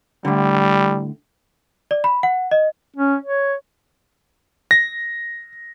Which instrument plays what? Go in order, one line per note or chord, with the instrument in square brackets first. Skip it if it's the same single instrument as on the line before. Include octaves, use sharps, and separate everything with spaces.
[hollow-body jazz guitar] A2 D3 [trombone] G3
[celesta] D5
B5
F#5
D#5
[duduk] C#4
C#5
[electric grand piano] A#6